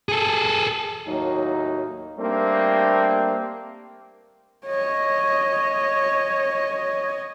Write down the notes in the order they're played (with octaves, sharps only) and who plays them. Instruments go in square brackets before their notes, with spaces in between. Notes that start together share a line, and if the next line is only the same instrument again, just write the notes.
[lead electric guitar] G#4 A4
[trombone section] D#2 A2 F#3 A#3 D#4
G3 A3 A#3 C4 D4 G4
[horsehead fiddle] C#5 D#5